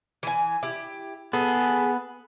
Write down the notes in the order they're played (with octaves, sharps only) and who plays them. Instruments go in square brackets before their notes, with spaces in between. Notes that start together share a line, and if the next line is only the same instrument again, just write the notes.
[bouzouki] E3 G#5
E4 G4
[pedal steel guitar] B3 [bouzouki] G#4 A4